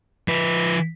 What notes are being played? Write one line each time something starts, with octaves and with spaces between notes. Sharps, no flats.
F3 B4